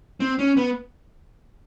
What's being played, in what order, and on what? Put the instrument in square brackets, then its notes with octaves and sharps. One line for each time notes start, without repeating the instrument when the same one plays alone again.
[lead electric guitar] C4
C#4
B3